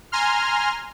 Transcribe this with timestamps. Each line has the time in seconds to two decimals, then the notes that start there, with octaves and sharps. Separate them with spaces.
0.12 G#5 A#5 C6 F6